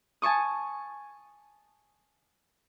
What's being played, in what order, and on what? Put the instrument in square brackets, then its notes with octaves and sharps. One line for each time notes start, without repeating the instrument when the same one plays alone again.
[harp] G#5 A5 C#6 D#6